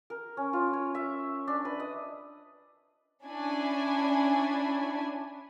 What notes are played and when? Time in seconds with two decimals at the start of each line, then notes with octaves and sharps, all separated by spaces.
0.10 A#4
0.37 C#4
0.53 F4
0.73 C#5
0.95 E5
1.48 D4
1.65 B4
1.80 D#5
3.24 C#4 D4 E4 G#5